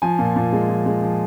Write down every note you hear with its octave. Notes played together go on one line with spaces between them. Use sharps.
F3 G#5
A#2
A#2
G#3
F3
G#3
F3